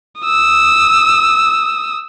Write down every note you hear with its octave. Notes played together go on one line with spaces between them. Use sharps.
D#6 E6